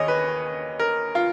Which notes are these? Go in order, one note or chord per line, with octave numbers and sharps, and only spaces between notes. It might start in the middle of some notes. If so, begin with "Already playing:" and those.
Already playing: D#2 D#3 G#4 C#5 D#5
B4
A#4
F4